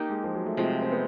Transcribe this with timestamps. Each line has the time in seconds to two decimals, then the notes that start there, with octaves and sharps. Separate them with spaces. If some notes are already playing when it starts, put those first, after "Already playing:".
Already playing: A#3 D#4 G4
0.10 G#3
0.24 F3
0.34 F#3
0.46 A3
0.57 C3 F3 G#3 A3
0.82 C4
0.92 B3